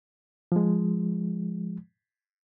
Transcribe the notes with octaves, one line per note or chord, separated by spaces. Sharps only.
F3 G#3